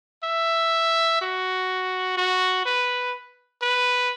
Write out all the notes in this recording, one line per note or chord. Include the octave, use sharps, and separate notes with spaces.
E5
F#4
F#4
B4
B4